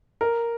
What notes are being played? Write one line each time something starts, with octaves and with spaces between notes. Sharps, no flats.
A#4